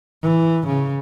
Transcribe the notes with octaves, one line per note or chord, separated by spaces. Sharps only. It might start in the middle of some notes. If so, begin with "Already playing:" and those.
E3
C#3